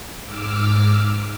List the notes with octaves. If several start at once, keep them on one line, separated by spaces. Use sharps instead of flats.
G#2 D6 E6 F6